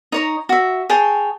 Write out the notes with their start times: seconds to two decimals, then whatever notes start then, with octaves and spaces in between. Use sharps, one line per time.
0.12 D#4 C#5 A#5
0.49 F#4 E5
0.89 G#4 C#5 G5 A5